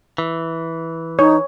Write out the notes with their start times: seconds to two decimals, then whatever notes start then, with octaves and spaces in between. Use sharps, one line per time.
0.18 E3
1.19 D#4 C#5